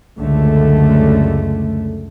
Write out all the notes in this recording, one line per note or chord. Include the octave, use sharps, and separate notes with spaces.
C#2 F#2 D3 A3